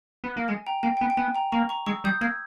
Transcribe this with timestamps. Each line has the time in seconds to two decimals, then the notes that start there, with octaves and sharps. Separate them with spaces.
0.24 B3
0.37 A#3
0.48 G#3 G#5
0.67 G5 A#5
0.83 A#3 G5
0.97 G5
1.01 B3 G#5
1.10 G5
1.17 B3 G#5
1.35 G5 A#5
1.52 A#3 A#5 C#6
1.69 A#5 C#6
1.86 G#3 C#6 E6
2.04 G3 D#6 G6
2.21 A#3 E6 G#6